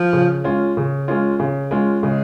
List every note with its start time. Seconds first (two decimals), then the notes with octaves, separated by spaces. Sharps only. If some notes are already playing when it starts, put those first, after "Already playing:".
Already playing: F3
0.13 C#3
0.44 G#3 C#4 F4
0.77 C#3
1.08 G#3 C#4 F4
1.40 C#3
1.71 G#3 C#4 F4
2.03 C#3 G#3